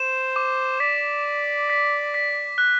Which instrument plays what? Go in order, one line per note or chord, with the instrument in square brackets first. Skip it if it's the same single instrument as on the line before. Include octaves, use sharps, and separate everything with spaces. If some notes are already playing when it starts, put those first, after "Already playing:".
Already playing: [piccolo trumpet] C5 [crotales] E7
[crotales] D6
[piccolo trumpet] D5 [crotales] B6
[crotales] E7
B6
B6
F#6